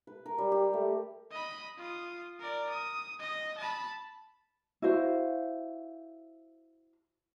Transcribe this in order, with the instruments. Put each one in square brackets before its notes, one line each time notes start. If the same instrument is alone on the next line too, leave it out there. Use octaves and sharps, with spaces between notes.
[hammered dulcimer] B4
A#4
G3
G4
A3
[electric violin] D#5 B5
F4 D#6
A#4 D5
D#6
D#5 A#6
A5 B5
[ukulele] E4 F#4 C5 F5